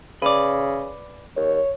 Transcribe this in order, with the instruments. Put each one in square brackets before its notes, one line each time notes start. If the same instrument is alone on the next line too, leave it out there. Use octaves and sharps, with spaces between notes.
[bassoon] C#3 [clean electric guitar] B4 D5
[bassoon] D#2 [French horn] C#5